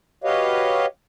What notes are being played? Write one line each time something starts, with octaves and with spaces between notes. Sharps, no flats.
F#4 G4 B4 C#5 D#5 F5